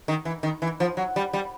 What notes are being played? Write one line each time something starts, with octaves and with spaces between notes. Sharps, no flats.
D#3
E3
D#3
E3
F3
F#3
G3
G3